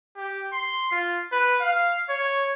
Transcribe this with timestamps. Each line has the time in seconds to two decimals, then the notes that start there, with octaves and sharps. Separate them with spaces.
0.17 G4
0.52 C6
0.92 F4
1.32 B4
1.61 F5
2.09 C#5